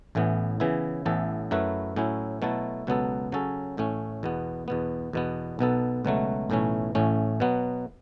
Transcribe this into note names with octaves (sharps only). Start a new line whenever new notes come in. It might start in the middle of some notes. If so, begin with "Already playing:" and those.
A1 A2 E3 B3
C#3 E3 B3 E4
A1 A2 E3 B3 A4
F#2 F#3 A3 E4 B4
A2 F#3 C#4 E4
B2 F#3 A3 E4 A4
C#2 B2 F#3 B3 A4
C#3 F#3 C#4 A4
A1 A2 A3 C#4
E2 B2 B3
E2 B2 B3
E2 B2 B3
B1 B2 B3 A4
C#2 B2 F#3 A3
B1 A2 E3 A3 C#4
A1 A2 A3 C#4
B2 F#3 B3